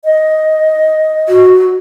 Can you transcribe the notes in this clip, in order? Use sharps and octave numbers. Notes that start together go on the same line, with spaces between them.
D#5
F#4